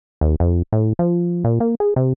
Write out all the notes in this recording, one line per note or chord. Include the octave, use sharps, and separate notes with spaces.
D#2
F2
A2
F3
A#2
A#3
G#4
C3